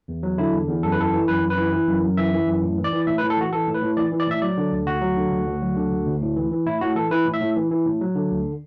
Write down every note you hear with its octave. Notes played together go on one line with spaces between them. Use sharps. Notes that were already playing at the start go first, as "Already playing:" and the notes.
E2
F#3
D3 E4
E2
E2
F#2 A4
B4
E3 A4
E3
F#2 B4
F#2
B4
E3
E3
F#2
F#2
E3 E5
E3
F#2
A2
E3
D5
E3
A2 E5
B4
A2
A4
E3 F#4
E3 A4
A2
B4
A2
E3 D5
E3
D5
A2 E5
F#3 D5
D3
D2
D2 F#4
F#3
D3
D2
D2
F#3
D3
D2
D2
A2
E3
E3
A2 E4
A2 F#4
E3 A4
E3 B4
A2
E5
A2
E3
E3
A2
F#3
D3
D2